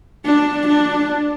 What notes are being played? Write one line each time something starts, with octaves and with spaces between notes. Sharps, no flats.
D4
D4